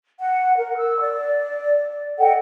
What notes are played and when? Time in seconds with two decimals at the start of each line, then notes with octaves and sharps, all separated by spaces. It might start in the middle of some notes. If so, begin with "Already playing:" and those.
0.20 F#5
0.58 A#4
0.77 E6
1.00 D5
2.19 A4 D#5 F#5 G5